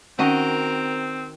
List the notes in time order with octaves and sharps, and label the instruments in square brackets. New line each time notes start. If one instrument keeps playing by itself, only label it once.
[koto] D#3 F#4 D#5 [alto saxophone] C4 [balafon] C#4 F#5 [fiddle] A#4